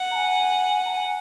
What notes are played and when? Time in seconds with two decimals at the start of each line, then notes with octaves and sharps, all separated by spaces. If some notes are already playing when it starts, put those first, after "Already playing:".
Already playing: F#5
0.11 A#5
0.16 G#5
0.85 A#5
0.89 G#5